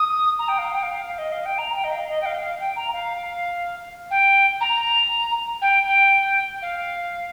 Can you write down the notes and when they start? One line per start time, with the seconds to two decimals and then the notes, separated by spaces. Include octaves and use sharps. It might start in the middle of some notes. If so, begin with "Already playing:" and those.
Already playing: D#6
0.39 A#5
0.48 G5
0.58 F5
0.74 G5
0.83 F5
1.18 D#5
1.32 F5
1.45 G5
1.58 A#5
1.75 G5
1.84 D#5
1.92 F5
2.09 D#5
2.21 G5
2.25 F5
2.43 F5
2.60 G5
2.76 A#5
2.93 F5
4.10 G5
4.60 A#5
5.61 G5
5.86 G5
6.62 F5